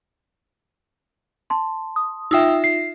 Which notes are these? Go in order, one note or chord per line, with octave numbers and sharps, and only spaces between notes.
A5 C6
D#6
D#4 F4 E5 G5 D#6 E6
C7